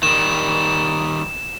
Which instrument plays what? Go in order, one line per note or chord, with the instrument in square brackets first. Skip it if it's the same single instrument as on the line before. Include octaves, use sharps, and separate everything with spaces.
[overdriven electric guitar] D#3 G3 [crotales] E7